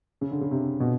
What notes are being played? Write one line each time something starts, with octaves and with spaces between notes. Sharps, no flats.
C#3
D3
C#3
C3
B2